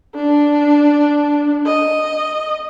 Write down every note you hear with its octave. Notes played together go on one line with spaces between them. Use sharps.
D4
D#5